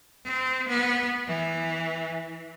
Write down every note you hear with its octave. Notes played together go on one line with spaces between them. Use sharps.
C4
B3
E3